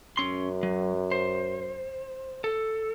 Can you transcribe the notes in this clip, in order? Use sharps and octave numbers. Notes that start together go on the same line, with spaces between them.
F#2 C#4 C6
F#3
C5
A4